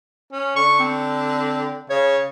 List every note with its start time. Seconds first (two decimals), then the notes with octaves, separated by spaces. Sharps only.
0.32 C#4
0.56 D3 C#6
0.79 C4
1.90 C#3 C#5